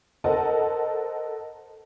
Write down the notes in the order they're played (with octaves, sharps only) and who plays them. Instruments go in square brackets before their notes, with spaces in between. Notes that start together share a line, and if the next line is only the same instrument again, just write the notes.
[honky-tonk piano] A4 A#4 C5 D#5 F#5 A5